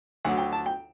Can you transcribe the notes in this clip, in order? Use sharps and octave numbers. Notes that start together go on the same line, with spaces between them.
D2 D3 F#3 F#5
G5
A5
G5